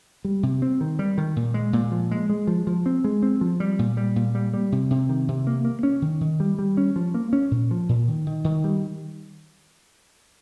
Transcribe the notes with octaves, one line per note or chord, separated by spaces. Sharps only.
G3
C3
C4
D#3
G3
D#3
A#2
G#3
A#2
F3
G#3
G#3
F3
F3
C4
G#3
C4
F3
G3
A#2
G3
A#2
G3
G3
C3
C3
D#3
C3
A#3
A#3
C#4
D#3
D#3
G3
G3
C#4
F3
A#3
C#4
A#2
F3
A#2
D#3
D#3
D#3
G3